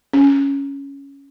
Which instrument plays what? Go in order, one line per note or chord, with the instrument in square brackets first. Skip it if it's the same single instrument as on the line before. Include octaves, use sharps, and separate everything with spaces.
[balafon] C#4